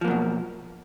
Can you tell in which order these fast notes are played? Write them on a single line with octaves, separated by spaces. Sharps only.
F3 A#3 F#3 B2